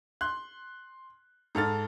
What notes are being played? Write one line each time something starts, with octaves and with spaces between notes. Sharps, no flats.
C6 F#6
G#2 A4 F6 A6